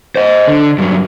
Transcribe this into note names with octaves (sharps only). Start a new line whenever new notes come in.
C5 D#5
D3
G2 F#3